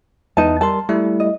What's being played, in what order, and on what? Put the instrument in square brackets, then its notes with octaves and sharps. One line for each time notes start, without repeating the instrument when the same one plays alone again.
[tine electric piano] E2 [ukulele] D#4 B4 A5
[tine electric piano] G3 A#4 C6 [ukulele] A5
[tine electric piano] G3 A3 E4
[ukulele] D#5